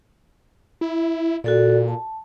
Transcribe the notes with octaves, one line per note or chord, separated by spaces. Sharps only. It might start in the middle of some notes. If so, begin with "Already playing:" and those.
E4
A#2 F#4 A4 D5
A5